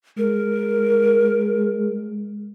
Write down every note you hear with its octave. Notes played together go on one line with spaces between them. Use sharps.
G#3 A#4